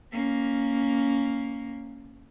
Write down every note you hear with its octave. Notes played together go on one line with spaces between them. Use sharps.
A#3 C#4